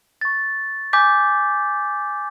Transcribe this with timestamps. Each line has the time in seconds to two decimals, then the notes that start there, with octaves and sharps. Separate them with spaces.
0.21 C#6 A6
0.93 G#5 D6 G6 B6